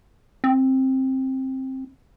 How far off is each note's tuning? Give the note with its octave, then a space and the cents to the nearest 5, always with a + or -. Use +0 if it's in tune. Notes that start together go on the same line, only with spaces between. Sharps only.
C4 +15